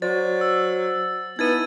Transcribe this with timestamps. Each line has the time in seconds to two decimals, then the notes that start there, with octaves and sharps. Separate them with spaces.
0.02 F#3 C5 D5 A6
0.41 E6
1.39 B3 D#4 E4 B4 G#6 A6 D#7